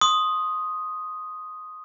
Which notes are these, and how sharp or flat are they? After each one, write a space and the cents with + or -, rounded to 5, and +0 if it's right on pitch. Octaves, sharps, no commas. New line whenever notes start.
C6 +25 D#6 +0